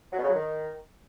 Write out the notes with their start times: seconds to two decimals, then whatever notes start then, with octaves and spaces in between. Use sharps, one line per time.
0.13 F#3
0.18 B2
0.24 C#3
0.29 F#3
0.34 D#3